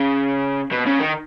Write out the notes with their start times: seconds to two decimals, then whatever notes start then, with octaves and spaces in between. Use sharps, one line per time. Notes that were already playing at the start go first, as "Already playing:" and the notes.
Already playing: C#3
0.71 B2
0.86 C#3
0.99 D#3